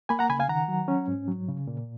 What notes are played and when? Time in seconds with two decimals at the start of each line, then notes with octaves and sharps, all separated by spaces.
0.09 A#3 G#5 B5
0.19 F#5 A#5
0.29 C#3 G#5 B5
0.40 F5 G#5
0.48 D#3 F#5 A#5
0.68 F#3
0.88 C#4
1.08 G#2
1.28 F#3
1.48 C#3
1.67 A#2